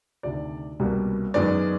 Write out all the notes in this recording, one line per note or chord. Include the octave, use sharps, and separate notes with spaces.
D2 C3 D#3 D5
C2 B2 G3 A#3
F#2 D#3 G#3 B3 D5